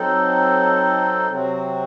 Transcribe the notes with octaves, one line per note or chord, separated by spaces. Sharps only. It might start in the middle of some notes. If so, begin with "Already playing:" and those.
Already playing: F#3 C4 D#4 A4
C3 F#3 C4 F#4